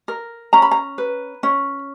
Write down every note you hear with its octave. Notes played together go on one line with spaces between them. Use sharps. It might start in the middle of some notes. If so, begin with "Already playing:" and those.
A#4
C#4 A#5
B5
A#5
B4
C#4